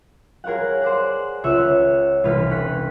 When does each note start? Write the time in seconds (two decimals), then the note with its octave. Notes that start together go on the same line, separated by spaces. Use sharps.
0.44 G#4 A#4 C#5 F5 F#5
0.82 C5 D5 F#5
1.44 C#2 C#5 E5 E6 F#6
2.24 E1 C2 D#4 B4 F6
2.51 C#6 F#6 B6